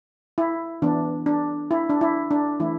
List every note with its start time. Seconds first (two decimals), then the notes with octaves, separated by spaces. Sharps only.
0.38 E4
0.82 E3 B3 D4
1.26 D4
1.71 E4
1.89 D4
2.01 E4
2.31 D4
2.60 E3 A3 E4